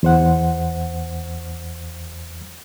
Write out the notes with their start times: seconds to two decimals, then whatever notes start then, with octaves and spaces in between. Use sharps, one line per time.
0.03 E2 C5 F#5